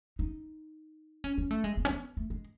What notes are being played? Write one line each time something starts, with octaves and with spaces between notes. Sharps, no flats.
D#4
C#4
C#4
A3
G#3
B3
C#4
B3
A3
G#3